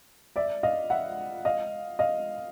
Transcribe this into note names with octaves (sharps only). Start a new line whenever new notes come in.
D5 E5
D#5 F5
E5 F#5
D#5 F5
D#5 F5